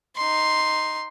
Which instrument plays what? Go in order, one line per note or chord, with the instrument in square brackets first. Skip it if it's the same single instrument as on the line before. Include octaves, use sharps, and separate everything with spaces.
[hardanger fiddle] D#4 C6